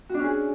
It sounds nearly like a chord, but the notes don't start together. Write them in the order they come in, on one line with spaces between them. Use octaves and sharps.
F#4 D4 C#4 G#4